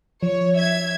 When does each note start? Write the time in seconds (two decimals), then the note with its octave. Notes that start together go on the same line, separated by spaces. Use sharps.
0.23 F3 C#5
0.58 E5 G#6